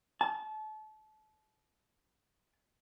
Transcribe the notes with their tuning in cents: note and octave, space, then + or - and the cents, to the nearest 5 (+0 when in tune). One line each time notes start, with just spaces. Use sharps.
A5 -30